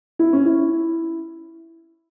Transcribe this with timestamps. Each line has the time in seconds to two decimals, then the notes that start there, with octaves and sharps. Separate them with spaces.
0.19 E4
0.33 C#4
0.45 E4